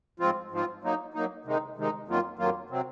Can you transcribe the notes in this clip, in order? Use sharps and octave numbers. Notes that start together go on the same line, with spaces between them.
G#2 F3 C4 F4
G#2 F3 C4 F4
F#3 A#3 D#4
F#3 A#3 D#4
C3 D#3 G#3 D#4
C3 D#3 G#3 D#4
F2 D#3 F#3 A#3 F4
F2 D#3 F#3 A#3 F4
C3 F#3 C4